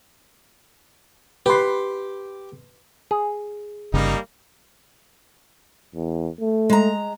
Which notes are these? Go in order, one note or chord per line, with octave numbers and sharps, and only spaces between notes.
G4 B4 C6
G#4
G1 C#3 G3 A#3 D#4
E2
A3
G#3 A#5